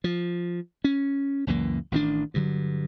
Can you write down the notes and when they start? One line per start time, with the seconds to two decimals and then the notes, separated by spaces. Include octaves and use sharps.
0.04 F3
0.84 C#4
1.47 C#2 F#2 E3 A#3
1.92 A1 D#3 A#3 D4
2.34 G2 D3 F#3